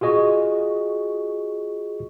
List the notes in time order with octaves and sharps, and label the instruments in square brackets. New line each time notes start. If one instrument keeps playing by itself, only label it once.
[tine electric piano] F4 F#4 G#4 D#5 C#6